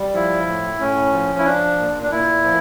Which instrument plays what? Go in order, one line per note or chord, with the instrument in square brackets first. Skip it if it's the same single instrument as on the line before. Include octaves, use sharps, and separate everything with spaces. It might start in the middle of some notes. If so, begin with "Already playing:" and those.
Already playing: [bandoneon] G3
F3 E4
A2
A2 C#4
F3
E4
F3 D4
A#2
D4
A#2 E4
F3